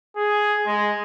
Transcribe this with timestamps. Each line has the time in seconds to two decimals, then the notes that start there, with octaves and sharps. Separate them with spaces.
0.17 G#4
0.67 G#3